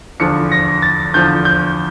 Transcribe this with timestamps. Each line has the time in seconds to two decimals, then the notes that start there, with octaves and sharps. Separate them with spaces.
0.20 E2 D3 F3 C#7
0.52 A#6
0.82 A6
1.14 E2 D3 F3 G6
1.45 G6